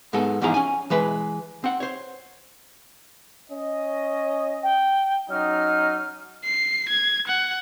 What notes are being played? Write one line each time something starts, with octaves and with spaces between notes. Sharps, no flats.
G#2 G#3 B3 A4
E2 G#2 F3 E4 G#4 A#5
C#4 G#5
E3 G#3 B4
C4 F#5
C5 C#5
C#4 D#5
G5
F#3 C#4 D#4 F6
C7
G#6
F#5